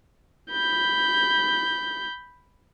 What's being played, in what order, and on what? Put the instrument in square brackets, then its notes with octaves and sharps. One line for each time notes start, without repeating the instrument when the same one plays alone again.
[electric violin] B5 G6